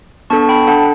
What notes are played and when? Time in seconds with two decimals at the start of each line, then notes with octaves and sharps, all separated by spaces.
0.30 B3 D4 A4 A5 C#6
0.49 G5 B5
0.67 D4 A4 F#5 A5